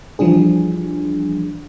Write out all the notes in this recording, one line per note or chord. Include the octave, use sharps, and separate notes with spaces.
E3 F3 G3 D4 G#4